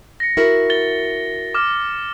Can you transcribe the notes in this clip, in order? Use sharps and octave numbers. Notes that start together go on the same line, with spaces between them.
A#6 C#7
E4 F#4 A#4
A6 G7
D6 F6